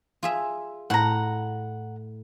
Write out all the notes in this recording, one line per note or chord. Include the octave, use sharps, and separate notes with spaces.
F4 G#4 E5
A2 F#5 A#5